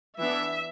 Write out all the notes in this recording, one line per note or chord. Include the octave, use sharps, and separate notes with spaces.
E3 B3 D4 E5